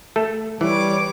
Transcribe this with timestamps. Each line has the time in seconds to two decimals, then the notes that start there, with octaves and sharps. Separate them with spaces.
0.16 A3 A4
0.61 E3 G3 B4 C#5 D6